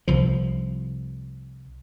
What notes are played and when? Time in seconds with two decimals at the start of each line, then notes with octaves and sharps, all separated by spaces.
0.08 C2 F3